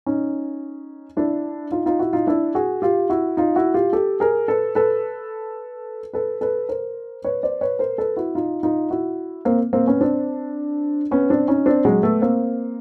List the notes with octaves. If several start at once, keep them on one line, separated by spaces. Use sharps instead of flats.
C#4 D#4
D4 E4
D#4 F4
D#4 F4
E4 F#4
D#4 F4
D4 E4
F#4 G#4
F4 G4
E4 F#4
D#4 F4
E4 F#4
F4 G4
G4 A4
G#4 A#4
A4 B4
A4 B4
A4 B4
A4 B4
A#4 C5
B4 C#5
C5 D5
B4 C#5
A#4 C5
A4 B4
E4 F#4
D#4 F4
D#4 F4
E4 F#4
A#3 C4
A#3 C4
B3 C#4
C4 D4
B3 C#4
C4 D4
C#4 D#4
C4 D4
F#3 G#3
A3 B3
A#3 C4